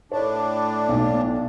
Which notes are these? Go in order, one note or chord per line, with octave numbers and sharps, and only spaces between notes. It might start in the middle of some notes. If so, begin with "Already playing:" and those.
A2 D4 C#5
B1